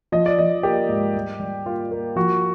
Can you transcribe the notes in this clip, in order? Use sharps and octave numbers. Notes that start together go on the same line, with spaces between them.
F3 D#5
D5
F3 D#5
A#3 G4
G#2
G3
G3
A#3 F4
A#3
F3 F#4